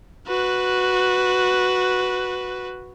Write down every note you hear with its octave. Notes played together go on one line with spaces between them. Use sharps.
F#4 B4